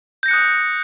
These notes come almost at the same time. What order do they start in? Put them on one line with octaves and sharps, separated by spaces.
G6 A#6 C#7 F#6 D#6